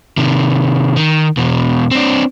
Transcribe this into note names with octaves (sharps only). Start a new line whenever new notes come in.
C3 D#3
D#3
E2 B2
C4 D4